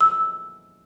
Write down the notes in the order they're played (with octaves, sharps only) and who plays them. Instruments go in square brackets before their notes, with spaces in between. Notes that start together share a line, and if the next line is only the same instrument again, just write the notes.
[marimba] E6